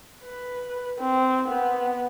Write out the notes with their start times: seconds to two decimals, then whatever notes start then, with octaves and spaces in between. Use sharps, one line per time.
0.23 B4
0.99 C4
1.48 B3